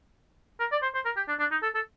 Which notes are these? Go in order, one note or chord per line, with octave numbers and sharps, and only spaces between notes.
A#4
D5
C5
C5
A#4
G4
D4
D4
D#4
A4
A4